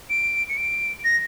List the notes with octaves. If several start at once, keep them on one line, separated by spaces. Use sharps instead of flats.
D7
C#7
D7
A#6